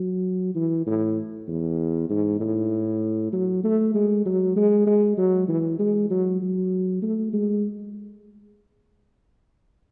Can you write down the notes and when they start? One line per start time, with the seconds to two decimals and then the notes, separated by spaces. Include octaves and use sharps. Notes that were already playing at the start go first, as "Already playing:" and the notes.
Already playing: F#3
0.55 E3
0.87 A2
1.48 E2
2.10 G#2
2.40 A2
3.33 F#3
3.64 A3
3.94 G#3
4.26 F#3
4.56 G#3
4.87 G#3
5.17 F#3
5.48 E3
5.79 G#3
6.10 F#3
6.42 F#3
7.02 A3
7.33 G#3